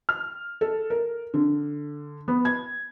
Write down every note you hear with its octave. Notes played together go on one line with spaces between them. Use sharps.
F6
A4
A#4
D3
B3
G#6